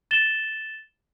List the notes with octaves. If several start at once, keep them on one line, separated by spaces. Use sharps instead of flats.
A6 E7 G7